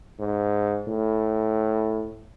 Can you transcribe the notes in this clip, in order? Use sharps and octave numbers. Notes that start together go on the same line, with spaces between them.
G#2
A2